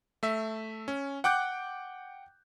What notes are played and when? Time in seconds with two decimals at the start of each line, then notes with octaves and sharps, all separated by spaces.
0.23 A3 E5
0.88 C#4
1.24 F#5 G5 D6 F#6 G6